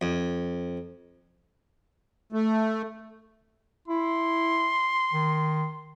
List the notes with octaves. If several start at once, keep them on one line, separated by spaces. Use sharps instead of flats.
F2
A3
E4 C6
D#3